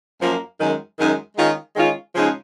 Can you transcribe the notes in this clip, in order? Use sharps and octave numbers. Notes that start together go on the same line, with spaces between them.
F#2 F3 A#3
F#2 D#3 G#3 D#4
F#2 D#3 G#3 D#4
D#3 G#3 C#4 F4
D#3 G#3 C#4 F4
C#3 F3 G#3 D#4